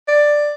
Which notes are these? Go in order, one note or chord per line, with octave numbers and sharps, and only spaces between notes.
D5